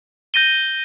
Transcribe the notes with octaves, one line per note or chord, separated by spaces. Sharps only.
G6 A#6 D#7 G7